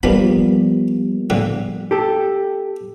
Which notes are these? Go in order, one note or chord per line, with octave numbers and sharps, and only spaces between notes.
G2 F3 G3 A#3 B3 B5
A#1 A2 D3
G4 A4